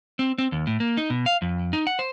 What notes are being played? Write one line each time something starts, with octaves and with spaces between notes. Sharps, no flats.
C4
C4
D#2
A2
A#3
D#4
B2
F5
F2
D#4
F#5
C5